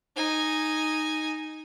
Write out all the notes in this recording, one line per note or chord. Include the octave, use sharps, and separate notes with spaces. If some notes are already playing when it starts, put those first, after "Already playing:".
D#4 G#5